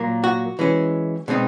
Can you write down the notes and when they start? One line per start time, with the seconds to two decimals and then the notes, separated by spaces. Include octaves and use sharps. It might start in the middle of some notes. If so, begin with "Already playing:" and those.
Already playing: A#2 F#3 A#3
0.24 F#4
0.59 E3 G#3 C#4
1.28 B2 G#3 C4 D#4